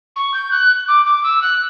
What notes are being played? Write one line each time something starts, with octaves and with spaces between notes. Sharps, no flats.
C#6
G6
F#6
D6
D6
E6
F#6